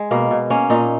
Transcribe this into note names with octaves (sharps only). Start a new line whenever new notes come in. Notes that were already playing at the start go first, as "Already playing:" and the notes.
Already playing: G#3
B2 A#3
B2
A#3 C#4
A#2 D#4